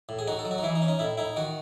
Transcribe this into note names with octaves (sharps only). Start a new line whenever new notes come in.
A2
G#4
D#4 F#4
A4
F#3
F#4
D#4
E3 E4
D#4
C#4
D#4
A2 E4
D#4 E4
D#3 F#4